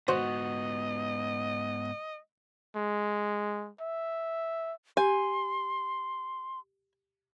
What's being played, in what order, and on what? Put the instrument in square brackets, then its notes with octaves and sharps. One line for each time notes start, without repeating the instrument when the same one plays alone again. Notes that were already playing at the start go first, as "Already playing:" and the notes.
[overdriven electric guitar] G#2 B3 [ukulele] F#4 [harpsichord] C5 [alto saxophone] D#5
[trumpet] G#3
E5
[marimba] G4 [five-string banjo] G#5 [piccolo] C6